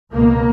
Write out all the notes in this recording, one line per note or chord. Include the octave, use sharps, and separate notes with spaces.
C#2 B2 A#3